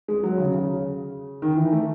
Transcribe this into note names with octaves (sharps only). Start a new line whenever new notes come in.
G#3
F#3
C#3
C#3
D#3
E3
A3